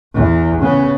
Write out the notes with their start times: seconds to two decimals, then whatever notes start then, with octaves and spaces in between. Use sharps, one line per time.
0.14 E2
0.61 C#3 B3